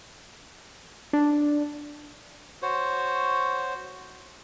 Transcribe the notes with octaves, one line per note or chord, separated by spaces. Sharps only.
D4
F#4 C5 C#5